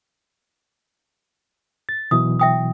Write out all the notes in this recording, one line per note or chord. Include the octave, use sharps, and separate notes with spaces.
A6
B2 E3 F#3 D#6
E5 G5 D#6